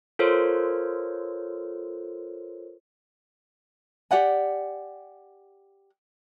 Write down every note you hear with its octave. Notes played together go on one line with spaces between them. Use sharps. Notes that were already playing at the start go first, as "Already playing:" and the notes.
F4 A4 A#4 C5 C#5
G4 D5 F#5 G#5